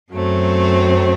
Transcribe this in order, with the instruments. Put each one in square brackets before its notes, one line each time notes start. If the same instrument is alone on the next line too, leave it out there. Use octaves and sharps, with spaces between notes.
[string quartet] F#2 F#3 A3 C4